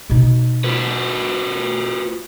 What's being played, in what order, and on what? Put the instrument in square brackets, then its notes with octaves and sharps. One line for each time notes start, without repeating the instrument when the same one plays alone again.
[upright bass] B2 D#4
[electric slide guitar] F4 F#4 B4